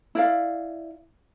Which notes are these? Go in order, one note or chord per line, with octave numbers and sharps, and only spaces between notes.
E4 D5 F5